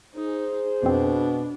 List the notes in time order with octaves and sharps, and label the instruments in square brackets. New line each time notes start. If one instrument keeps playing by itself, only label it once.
[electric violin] D#4 [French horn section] G#4 C5
[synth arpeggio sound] F2 C4 [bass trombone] B2 [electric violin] D4